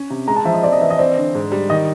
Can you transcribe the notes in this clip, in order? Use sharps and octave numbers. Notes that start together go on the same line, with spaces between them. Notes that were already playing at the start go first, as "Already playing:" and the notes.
Already playing: C#4
C3
G#3 A#5
A5
F3 E5
D#5
C4 D5
D#5
E3 E5
D#5
C4 D5
D3
G#2
G3
D#3 D#5